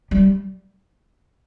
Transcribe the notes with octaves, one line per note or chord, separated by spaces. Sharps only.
G3